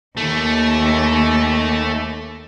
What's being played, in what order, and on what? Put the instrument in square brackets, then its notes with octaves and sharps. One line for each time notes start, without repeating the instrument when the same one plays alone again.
[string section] D#2 [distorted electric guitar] A3